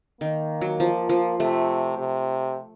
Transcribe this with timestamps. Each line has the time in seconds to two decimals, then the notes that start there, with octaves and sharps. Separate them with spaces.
0.21 D#3 A#3
0.61 F#3
0.80 F3
1.09 F3
1.39 C3 A3
1.98 C3